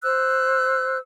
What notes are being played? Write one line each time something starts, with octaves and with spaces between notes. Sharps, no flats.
C5 E6 F#6